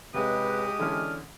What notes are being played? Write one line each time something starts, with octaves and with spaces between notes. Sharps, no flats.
C#2 C3 G#3 G4 B4 D#6
D3 E3 C#4 D4 F6